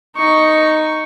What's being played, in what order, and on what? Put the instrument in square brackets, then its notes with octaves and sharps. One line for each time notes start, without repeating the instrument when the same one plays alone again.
[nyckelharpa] D#4 C#6